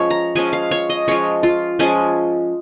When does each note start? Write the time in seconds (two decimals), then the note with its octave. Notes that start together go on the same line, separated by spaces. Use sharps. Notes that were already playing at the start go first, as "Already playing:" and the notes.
Already playing: F3 G#3 C#4 C#5
0.10 A#5
0.35 F3 G#3 C#4 G#5
0.53 F5
0.71 C#5
0.90 D#5
1.08 F3 G#3 C#4 C#5
1.43 F4
1.79 F3 G#3 C#4 G#5